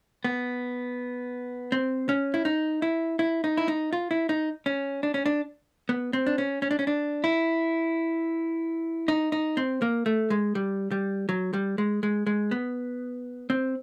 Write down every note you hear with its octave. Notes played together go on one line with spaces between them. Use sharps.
B3
C4
C#4
E4
D#4
E4
E4
D#4
E4
D#4
F4
E4
D#4
C#4
D4
C#4
D4
B3
C4
D4
C#4
C#4
D4
C#4
D4
E4
D#4
D#4
C4
A#3
A3
G#3
G3
G3
F#3
G3
G#3
G#3
G#3
B3
C4